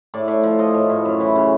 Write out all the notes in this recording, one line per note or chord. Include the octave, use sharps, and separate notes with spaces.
A2 D5
A2
F3
F3 D#5
A2
A2
F#2
E3
C#3